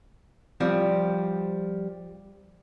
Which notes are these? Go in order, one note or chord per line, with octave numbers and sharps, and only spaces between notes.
F3 G3 C4